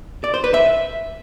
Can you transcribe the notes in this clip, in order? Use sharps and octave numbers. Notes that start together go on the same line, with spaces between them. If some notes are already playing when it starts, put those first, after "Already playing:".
D5
C5
B4
E5